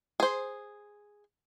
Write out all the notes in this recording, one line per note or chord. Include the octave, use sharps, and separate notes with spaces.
G#4 C5